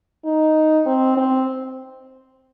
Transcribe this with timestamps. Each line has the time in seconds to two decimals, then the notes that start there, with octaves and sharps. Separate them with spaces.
0.25 D#4
0.86 C4
1.17 C4